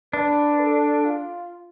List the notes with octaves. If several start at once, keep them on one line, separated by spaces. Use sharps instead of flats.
D4 B4
A4
F4